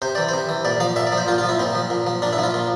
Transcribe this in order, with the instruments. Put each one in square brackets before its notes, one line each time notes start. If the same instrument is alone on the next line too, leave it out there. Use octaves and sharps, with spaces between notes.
[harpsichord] C3 C5
E3 D5
C3 C5
E3
A#2 D5
F3 F5
A#2 E5
D5
F3
C5
A#2 F4
F4
F3
E4
A#2 C4
F3
A#2
F3
A#2 D4
E4
F3
F4
A#2